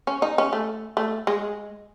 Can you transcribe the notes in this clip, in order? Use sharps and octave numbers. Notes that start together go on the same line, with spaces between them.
C#4
D#4
C#4
A3
A3
G#3